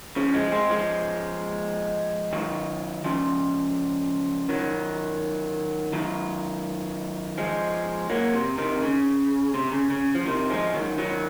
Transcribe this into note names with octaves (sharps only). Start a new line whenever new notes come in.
C#3 F3
F3 G#3
G#3 C4
F3 G#3
D#3 F#3
C#3 F3
D#3 F#3
D#3 F#3
F3 G#3
F#3 A#3
C3
C3 D#3
C#3
C3
C#3
C#3
F3
C3 D#3
F3 G#3
D#3 F#3
D#3 F#3